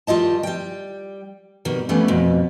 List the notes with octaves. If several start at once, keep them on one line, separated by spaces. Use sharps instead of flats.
D#3 G3 F4 D#5 A5
G3 G5
B2 D#3 G3
E3 F3 G3 A3 B3 C#4
F2 B2